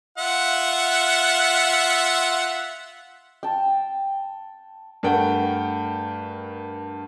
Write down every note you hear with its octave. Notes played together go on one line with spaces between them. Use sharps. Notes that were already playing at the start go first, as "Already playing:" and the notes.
F4 E5 F#5
G5 A5
G2 A3 A#4 F#5 G5